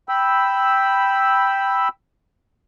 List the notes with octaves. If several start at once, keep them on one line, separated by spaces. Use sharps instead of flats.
G5 B5 E6